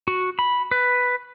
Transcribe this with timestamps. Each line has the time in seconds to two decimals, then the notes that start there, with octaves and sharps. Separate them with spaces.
0.08 F#4
0.39 B5
0.71 B4